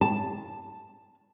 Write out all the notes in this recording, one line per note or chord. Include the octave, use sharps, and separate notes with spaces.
A5